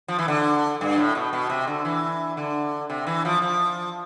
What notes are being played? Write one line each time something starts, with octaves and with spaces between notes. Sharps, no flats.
F3
E3
D3
G2
A2
B2
B2
C3
D3
E3
D3
C3
E3
F3
F3